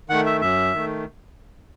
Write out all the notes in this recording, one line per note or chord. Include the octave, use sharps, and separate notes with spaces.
D#3 A3 F#5
E5
F#2 E5
D#3 A3